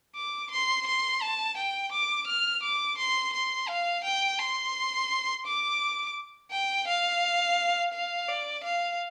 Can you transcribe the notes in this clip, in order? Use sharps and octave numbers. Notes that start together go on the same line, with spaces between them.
D6
C6
C6
A5
G5
D6
F6
D6
C6
C6
F5
G5
C6
D6
G5
F5
F5
D5
F5